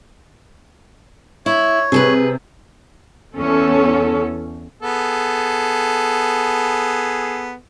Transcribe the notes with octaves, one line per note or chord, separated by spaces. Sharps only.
E4 C#5
C3 G#4 A4 B4
E2 C#4 A4
B3 G#4 A4